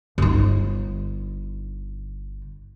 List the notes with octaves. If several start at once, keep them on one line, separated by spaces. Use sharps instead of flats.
G1 D#4